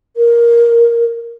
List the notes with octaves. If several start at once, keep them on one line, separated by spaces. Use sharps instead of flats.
A#4